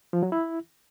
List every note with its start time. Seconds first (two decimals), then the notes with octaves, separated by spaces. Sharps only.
0.13 F3
0.23 F#3
0.32 E4